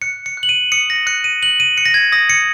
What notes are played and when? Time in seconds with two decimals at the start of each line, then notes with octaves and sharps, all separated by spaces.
0.02 F#6 C#7
0.26 C#7
0.37 F#6
0.43 F#7
0.49 D#7
0.72 D#6 C#7
0.90 A#6
1.07 F#6 C#7
1.24 D#7
1.43 F#6 F#7
1.60 D#7
1.77 F#6 C#7
1.86 A#6
1.94 G#6
2.12 D#6 A#6
2.30 C#7